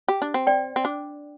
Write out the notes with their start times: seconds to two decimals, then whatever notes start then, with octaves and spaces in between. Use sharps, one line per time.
0.08 G4
0.22 D4
0.34 C4
0.47 D5 G5
0.76 C4
0.85 D4